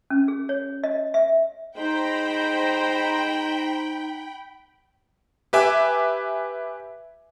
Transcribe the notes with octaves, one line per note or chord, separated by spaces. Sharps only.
C#4
G#4
C#5
D#5
E5
G#3 D#4 C5 G5 A#5 B5
G4 B4 E5 G#5 D6